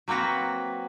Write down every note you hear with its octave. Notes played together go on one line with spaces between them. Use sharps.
F#3 A#3 C4 F#4 B4